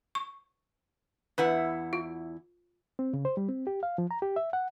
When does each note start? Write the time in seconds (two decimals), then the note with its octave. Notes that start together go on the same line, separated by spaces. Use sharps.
0.15 C#6
1.38 E2 E4 B4 F#5
1.93 F4
2.99 C4
3.14 C#3
3.25 C5
3.37 G3
3.49 C4
3.67 G4
3.83 F5
3.98 F3
4.11 A#5
4.22 G4
4.36 E5
4.53 F#5